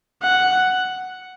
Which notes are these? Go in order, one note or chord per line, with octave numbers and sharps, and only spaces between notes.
F#5